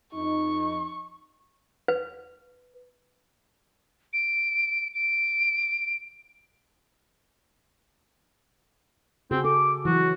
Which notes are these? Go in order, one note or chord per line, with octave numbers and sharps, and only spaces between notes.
F2 D#4 C#6
B4
D7
D7
C#3 C4 F#4 G#4
A4 D6
E3 F#3 F#4